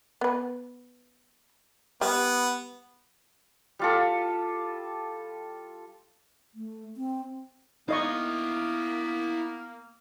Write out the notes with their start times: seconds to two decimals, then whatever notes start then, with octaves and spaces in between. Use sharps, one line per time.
0.21 B3 B4
2.01 G3 B3
3.79 G3 F4 A4
6.55 A3
6.97 C4
7.89 A#3 B3 D#4 E4 D#5 F5 C#6